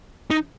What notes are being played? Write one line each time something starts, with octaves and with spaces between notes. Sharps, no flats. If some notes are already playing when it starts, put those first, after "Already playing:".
D#4